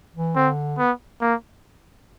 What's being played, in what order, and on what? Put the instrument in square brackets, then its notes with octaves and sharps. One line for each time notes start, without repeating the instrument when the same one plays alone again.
[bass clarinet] E3
[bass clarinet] D3 [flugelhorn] C4
[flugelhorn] B3
A#3